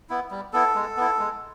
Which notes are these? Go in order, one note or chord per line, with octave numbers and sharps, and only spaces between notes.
B3 E4
G3
B3 E4 A4
G#3
B3 E4
G#3